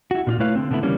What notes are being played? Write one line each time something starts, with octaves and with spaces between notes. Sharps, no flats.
E4 F#4
A#2 D4 F4
A3 E4 B4 C#5 F5
D3 C4
B2 D3 A3 B3 E4
C#3 E3 G3 A#3 C#4